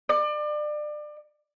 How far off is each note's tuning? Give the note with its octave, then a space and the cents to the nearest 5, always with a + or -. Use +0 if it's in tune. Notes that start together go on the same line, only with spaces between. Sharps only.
D5 +30